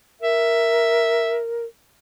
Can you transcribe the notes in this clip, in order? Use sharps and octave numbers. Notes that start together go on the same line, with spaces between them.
A#4 E5